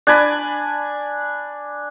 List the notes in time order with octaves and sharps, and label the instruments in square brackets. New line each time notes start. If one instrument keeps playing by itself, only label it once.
[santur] D4 G#5 B5